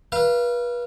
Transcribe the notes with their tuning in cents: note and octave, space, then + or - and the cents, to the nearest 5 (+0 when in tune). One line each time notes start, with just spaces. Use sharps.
B4 -35 F5 -30